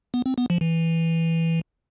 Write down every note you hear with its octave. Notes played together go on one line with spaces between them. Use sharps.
B3
C4
B3
F3
E3